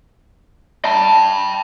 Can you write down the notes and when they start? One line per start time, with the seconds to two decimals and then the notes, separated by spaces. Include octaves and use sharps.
0.85 G5 A5